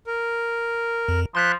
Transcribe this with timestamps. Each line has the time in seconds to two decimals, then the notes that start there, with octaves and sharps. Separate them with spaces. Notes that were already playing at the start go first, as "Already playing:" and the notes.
0.07 A#4
1.08 F2
1.35 F3 C6 F#6 B6